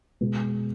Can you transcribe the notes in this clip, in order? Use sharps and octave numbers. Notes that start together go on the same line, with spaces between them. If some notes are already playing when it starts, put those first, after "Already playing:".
B2 G#3 B3